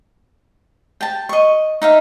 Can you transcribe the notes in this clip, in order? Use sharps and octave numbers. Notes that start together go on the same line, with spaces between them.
G5 A5
D#5 C#6
D#4 E5 F5